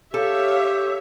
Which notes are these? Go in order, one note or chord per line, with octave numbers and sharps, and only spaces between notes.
G4 A4 C#5 E5 F5